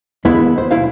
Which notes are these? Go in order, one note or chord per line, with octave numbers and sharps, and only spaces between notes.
D#2 G#3 B3 E4 B5
C5
B1 E4 C5 F5